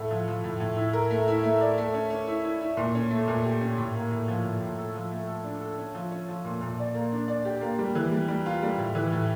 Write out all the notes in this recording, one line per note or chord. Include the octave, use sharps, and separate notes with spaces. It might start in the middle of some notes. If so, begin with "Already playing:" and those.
Already playing: A2 A3
F3
F3
A2
A2
E4
A#4
A3
E4
A3
D5
A3
C#4
C#4
E4
E4
E4
A#2
C#4
A3
A#2
G4
C#4
A2
A#3
A2
F3
A2
A2
A4
F3
A3
A4
D4
A4
C#4
F3
C#4
F3
A#2
A#2
D5
A#3
D4
D5
G4
A#3
G3
E3
G3
G3
F4
G3
A2
E3
A2